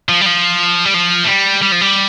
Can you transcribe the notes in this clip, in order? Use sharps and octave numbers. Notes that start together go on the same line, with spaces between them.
F3
G3
F3
G3
F3
A3
G3
G3
F3
G3